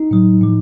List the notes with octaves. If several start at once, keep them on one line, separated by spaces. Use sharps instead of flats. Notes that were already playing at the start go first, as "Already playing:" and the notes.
Already playing: D#4
A2 F#3
A2 F3